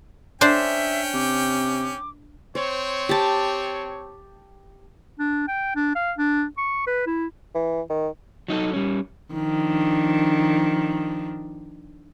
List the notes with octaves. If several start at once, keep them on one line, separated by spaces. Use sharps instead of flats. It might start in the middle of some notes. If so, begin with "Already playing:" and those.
C#4 D4 C5 E5 G5
C3 D6
C4 C5 C#5
G4 A5
D4
G5
D4
F5
D4
C#6
B4
E4
E3
D#3
F#3 D#4 G4 A4
G3 C#4
D#3 F3 D4